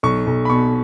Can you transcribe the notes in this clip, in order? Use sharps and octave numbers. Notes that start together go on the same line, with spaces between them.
B1 C#6
B1
B5
B2 C#6